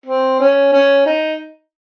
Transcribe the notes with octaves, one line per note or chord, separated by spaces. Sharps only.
C4
C#4
C#4
D#4